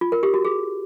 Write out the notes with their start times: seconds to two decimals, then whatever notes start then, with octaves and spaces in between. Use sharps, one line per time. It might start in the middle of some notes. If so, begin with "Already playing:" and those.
0.01 F4
0.12 A#4
0.23 G4
0.34 F#4
0.45 G#4